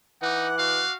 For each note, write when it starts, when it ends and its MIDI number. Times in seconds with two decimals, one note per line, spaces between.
0.22 0.83 52
0.22 0.48 63
0.22 0.58 78
0.22 0.91 86
0.22 0.91 90
0.59 0.98 66
0.59 0.96 77